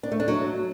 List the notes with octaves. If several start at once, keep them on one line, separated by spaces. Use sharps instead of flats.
D4
A3
D4
F#3